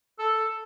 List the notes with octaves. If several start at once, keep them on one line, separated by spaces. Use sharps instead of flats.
A4